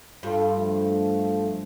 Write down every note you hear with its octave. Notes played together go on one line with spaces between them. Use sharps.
G2 F4 A4
F3 A3